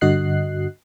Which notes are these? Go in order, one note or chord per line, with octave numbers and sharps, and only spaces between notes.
G2 D3 F#4 D#5 F#6 C7